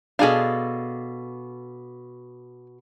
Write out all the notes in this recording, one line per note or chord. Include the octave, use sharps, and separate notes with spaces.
B2 D4 G#4 A4 F5